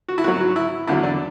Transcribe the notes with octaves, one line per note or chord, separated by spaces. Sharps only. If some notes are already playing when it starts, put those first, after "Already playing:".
F#4
E4
G#2 F#3 F#4
F#4
E4
E2 D3 F#3 E4
D4